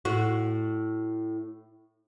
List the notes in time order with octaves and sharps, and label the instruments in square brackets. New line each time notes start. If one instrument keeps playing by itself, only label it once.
[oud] A2 F#4